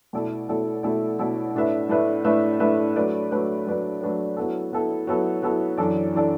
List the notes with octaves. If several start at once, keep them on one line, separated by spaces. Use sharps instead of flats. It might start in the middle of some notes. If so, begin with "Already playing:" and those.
B2 A3 E4 A4 D5
B2 A3 E4 A4 D5
B2 A3 E4 A4 D5
B2 A3 E4 A4 D5
A2 A3 D4 B4 E5
A2 A3 D4 B4 E5
A2 A3 D4 B4 E5
A2 A3 D4 B4 E5
F#3 A3 D4 B4 D5
F#3 A3 D4 B4 D5
F#3 A3 D4 B4 D5
F#3 A3 D4 B4 D5
F#3 B3 E4 A4
F#3 B3 E4 A4
F#3 B3 E4 A4
F#3 B3 E4 A4
F#2 E3 D4 A4 D5
E3 D4 A4 D5